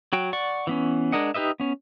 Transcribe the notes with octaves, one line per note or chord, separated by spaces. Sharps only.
F#3 F#4 G5
D5 F#5 C#6
E3 B3 C#4
G#3 D4 A#4 D#5 F#5
D#4 G4 B4 D#5 E5
B3 C#4